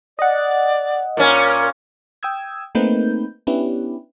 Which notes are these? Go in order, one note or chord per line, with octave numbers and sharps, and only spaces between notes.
D5 D#5 F#5
A#2 C#4 A#4
G5 D#6 E6 G#6
A3 A#3 C4 D#4 B4 G6
B3 C#4 D4 E4 G4 B4